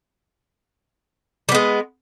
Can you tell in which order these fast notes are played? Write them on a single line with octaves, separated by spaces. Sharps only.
G3 B3 G#3